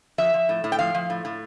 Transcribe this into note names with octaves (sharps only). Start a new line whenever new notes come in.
F3 E5
F3
A2
A2
G5
F3 F5
F3
A2
A2